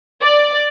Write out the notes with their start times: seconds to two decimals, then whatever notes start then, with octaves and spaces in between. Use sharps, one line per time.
0.21 D5